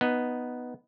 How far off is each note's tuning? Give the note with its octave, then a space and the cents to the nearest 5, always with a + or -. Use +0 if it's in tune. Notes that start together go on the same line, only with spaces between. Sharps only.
B3 +0 D#4 +0